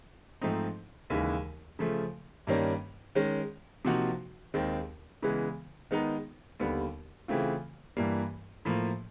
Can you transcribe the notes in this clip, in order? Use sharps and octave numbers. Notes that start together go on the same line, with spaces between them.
G#2 F3 A3 C4 D#4
D#2 C#3 E3 G#3
C#3 F3 A3
G2 D#3 G3 A#3 C#4
D#3 G#3 C#4
C3 F3 A#3 D#4 F#4
D#2 D#3 G#3 C4
C#3 E3 G#3 B3
D#3 G#3 B3 D#4
D#2 D3 G3 B3
C#3 E3 A3 C4 F4
G2 E3 G3 A#3
A2 F3 A#3